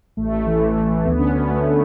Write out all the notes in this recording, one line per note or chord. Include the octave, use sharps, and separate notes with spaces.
A1 A3
A1
E3
A1
A1
E3
D2 B3
D3 C#4
D3 B3
D2 A3
A3